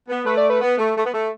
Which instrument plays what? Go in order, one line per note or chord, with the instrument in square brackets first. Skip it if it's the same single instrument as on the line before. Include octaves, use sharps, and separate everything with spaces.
[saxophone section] B3
[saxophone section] A3 [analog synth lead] B4
[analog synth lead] D5
B4
[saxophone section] B3
A3
A3
B3
A3